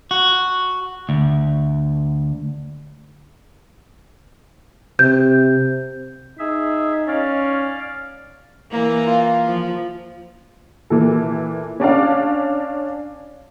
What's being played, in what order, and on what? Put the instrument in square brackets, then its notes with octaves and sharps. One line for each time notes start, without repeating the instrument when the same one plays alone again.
[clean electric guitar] F#4
D2
[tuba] C3 [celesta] G6
[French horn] D#4 [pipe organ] G#4 E5
[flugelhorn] C#4 [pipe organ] D5 F5
[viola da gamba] E3 A#3
[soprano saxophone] F4
[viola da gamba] F3
[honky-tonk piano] A#2 E3 A4
C#4 D4 D5 F5